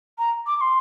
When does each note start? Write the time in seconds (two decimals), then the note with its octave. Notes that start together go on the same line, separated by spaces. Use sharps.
0.18 A#5
0.47 D6
0.57 D6
0.61 C6